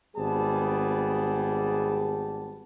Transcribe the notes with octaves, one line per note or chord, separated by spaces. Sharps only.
G#1 G3 B3 G#4 A5